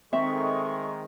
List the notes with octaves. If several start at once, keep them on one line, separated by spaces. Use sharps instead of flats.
D#3 G#3 C4 A4 E5 C6 C#6